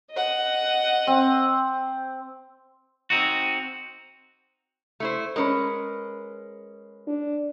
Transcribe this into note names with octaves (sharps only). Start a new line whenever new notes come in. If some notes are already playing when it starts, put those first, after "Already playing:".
D#5 F#5
C4
C4 D#4 F#4
A3 E4 C5
G#3 C#4 A#4 B4
D4